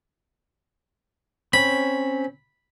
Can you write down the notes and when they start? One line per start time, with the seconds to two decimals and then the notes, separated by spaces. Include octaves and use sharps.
1.53 C4 C#4 B5